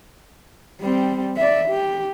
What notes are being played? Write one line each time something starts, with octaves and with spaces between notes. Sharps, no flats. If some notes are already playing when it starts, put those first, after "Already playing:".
G3 C4
D5 E5
G4